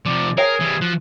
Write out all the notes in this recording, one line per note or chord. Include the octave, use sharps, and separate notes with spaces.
C3 F3 D5
G#4 A#4 C#5 F5 G5
E3 G3
F3 F#4